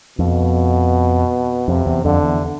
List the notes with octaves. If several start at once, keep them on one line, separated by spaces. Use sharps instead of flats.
F2 B2
F2 C3
E2
F2 D3
E2